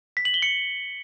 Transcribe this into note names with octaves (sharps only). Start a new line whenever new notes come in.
B6
F#7
G7
C#7